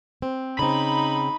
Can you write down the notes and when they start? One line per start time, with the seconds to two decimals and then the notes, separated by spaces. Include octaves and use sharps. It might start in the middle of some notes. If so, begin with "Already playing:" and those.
0.22 C4
0.59 C#3 C4 D#4 B5